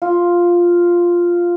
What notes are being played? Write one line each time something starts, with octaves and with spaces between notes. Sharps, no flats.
F4